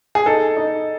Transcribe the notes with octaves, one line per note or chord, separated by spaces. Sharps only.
G#4
D#4 A4
D#4